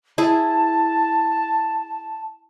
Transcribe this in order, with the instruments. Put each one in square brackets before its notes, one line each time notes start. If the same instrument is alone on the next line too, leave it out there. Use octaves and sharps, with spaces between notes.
[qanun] E4 G#4 [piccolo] A5